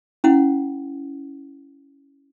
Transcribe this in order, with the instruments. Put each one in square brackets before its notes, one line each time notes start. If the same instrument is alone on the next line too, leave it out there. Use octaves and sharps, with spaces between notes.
[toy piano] C#4 E4 F#5